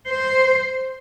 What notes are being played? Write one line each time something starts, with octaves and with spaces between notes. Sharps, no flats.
C5